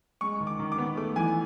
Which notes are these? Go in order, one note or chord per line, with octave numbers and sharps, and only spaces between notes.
G#3 C#6
D#3
D6
D#3
D6
B3
A3 D6
E3 G#5